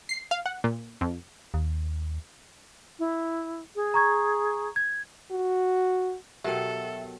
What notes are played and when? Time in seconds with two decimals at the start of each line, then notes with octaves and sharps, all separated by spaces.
0.09 C7
0.31 F5
0.46 F#5
0.64 A#2
1.01 F2
1.54 D#2
2.99 E4
3.76 G#4
3.94 A#5 C#6 G#6
4.76 G#6
5.31 F#4
6.44 B2 F#3 G4 A4 A#4 E5 G5